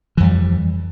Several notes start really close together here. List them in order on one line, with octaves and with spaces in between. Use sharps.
E3 F2 G3